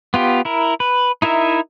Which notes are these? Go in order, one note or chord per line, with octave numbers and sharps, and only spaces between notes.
B3 F4 G4
E4 A#4
B4
D#4 E4 A#4 E5